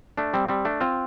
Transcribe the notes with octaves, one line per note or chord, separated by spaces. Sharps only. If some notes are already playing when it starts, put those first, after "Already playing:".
A3 D4
G3 C4
G3 C4
A3 D4
C4 F4